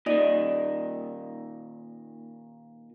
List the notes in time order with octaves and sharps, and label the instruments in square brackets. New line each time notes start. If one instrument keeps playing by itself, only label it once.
[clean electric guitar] A#2 D#3 [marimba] D#4 D5 D#5